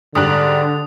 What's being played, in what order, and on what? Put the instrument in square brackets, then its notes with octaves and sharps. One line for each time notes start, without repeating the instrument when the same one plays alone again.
[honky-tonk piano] G#2 G3 F#6 [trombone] D3 [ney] D4 [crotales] D#6